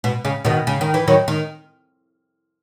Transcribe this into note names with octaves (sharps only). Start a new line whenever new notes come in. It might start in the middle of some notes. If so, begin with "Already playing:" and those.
B2
C#3
B2 D#3
C#3
D#3
E3
D#3 F#3
D#3